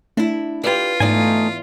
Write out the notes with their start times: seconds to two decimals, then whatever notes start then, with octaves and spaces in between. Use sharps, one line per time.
0.17 A3 D4 E4
0.64 F4 G4 B4 D5
1.00 E2 G#2 A3 D#4 D5 F5 G#5